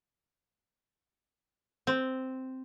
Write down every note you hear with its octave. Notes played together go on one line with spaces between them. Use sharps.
C4